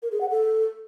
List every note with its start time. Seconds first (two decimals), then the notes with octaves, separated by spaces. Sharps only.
0.03 A#4
0.12 G#4
0.21 F#5
0.30 A4